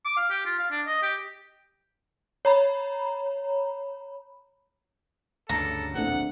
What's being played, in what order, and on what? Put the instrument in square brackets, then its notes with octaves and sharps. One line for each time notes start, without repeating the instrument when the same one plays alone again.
[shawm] D6
F5
G4
F4
F5
D4
D#5
G4
[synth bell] C#5 A#5 B5
[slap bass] D2 G2 C#3 [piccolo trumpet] A4 [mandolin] A#5
[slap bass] D1 A#1 [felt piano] A3 C4 D4 [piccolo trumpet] F#5